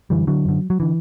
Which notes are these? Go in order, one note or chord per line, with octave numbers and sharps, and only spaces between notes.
F#2 D3 E3 G3
D3 F#3
F#2 D3
F#3
D3 E3